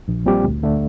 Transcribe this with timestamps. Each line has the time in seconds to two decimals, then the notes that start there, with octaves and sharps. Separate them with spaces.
0.08 A#1
0.26 A#2 G3 C4 G4
0.44 D2
0.63 D3 A3 D4